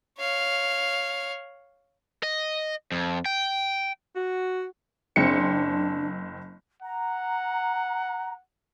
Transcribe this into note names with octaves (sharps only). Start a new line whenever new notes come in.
C#5 F5
D#5
F2
G5
F#4
F#1 C4 D4 C#7
F#5 A#5